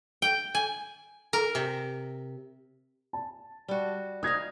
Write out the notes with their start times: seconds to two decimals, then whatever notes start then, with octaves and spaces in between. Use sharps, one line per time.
0.22 G5
0.55 G#5
1.33 A#4
1.55 C3
3.13 A5
3.68 G3 F#4
4.23 D#4 F5 D#6 G#6 A#6